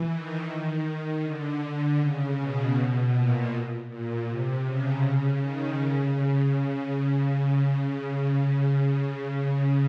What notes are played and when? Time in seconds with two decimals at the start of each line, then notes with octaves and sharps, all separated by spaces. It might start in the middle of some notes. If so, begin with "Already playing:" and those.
Already playing: E3
0.11 D#3
1.24 D3
2.00 C#3
2.38 B2
3.13 A#2
3.89 A#2
4.27 C3
4.65 C#3
5.39 D#3
5.77 C#3